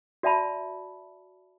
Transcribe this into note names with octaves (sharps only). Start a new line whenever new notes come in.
F#4 D5 E5 A5 B5